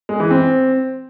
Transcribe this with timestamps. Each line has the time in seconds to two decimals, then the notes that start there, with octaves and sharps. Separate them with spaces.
0.09 G#3
0.20 E3
0.31 C4